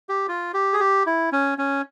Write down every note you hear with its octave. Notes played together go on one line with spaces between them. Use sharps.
G4
F4
G4
G#4
G4
E4
C#4
C#4